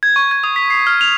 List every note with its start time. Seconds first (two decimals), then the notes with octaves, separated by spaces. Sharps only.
0.03 G#6
0.16 C#6
0.31 G#6
0.44 D#6
0.56 B6
0.70 C7
0.87 F6
1.01 F7